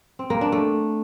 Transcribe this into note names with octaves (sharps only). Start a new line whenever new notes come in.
C4
A#3
D4
A3